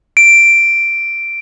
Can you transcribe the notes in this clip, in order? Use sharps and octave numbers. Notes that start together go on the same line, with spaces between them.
D7